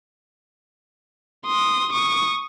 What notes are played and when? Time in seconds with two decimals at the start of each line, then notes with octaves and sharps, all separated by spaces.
1.45 C6 D#6
1.93 C#6 D#6